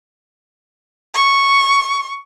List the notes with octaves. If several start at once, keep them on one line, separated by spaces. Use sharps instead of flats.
C#6